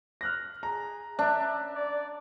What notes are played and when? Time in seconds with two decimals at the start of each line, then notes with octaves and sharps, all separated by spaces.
0.21 F6 F#6 A#6
0.63 G#4 A#5
1.19 D4 E5
1.74 D5